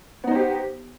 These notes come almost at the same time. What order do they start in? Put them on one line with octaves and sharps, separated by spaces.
B3 D#4 C5 G4